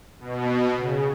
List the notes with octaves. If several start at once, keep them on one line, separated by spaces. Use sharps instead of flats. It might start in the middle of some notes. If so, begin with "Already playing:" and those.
B2
C#3